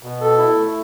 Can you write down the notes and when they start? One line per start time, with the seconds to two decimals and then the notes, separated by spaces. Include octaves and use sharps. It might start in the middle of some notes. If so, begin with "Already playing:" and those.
0.03 B2
0.21 A4
0.38 E4
0.56 A3